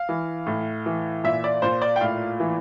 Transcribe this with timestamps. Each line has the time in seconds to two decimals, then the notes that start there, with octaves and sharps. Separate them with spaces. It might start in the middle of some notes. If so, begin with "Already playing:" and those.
Already playing: F5
0.09 E3
0.47 A2
0.86 E3
1.24 A#2 E5
1.44 D5
1.62 A#2 C5
1.82 D5
1.96 G5
2.01 A2 F5
2.40 E3